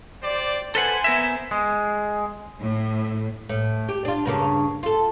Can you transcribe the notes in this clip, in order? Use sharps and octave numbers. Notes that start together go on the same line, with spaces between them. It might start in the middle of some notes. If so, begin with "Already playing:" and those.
G4 C5 D5
A4 B4 C5 F#5 G#5
B3 A#4 E5
G#3
A2
A2
G4
D4 F4
G2 C#3 A#3
F4 A4